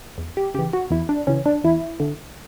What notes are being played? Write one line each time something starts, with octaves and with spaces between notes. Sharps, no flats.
E2
G4
C#3 E3 G4
F#4
E2 E4
D4
C#3 E3 C#4
D4
E2 E4
D3